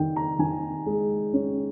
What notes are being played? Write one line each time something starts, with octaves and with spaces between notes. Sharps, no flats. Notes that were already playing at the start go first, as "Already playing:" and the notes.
Already playing: D#3 G5
A#5
D#3 G#5
G#3
C#4